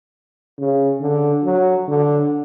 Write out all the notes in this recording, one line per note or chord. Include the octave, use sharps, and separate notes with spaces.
C#3
D3
F#3
D3